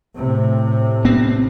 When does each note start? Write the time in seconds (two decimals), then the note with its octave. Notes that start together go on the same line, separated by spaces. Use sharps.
0.15 A2 C3
1.05 B3 C4